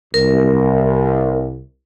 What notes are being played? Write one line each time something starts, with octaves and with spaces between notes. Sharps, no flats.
C2 A#4